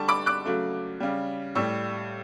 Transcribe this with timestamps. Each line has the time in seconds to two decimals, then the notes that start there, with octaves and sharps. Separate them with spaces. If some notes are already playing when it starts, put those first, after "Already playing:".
Already playing: D3 G3 A5 C#6
0.08 B5 D6
0.26 D6 F#6
0.45 C#3 F#3 A3
1.00 C#3 G3
1.55 A2 G3 C#6 E6